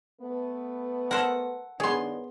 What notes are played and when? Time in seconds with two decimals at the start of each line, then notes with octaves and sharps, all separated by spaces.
0.21 A3 B3 B4
1.11 A4 A#4 C5 F#5
1.80 G2 D#3 B3 D4 G#4 C#5 C6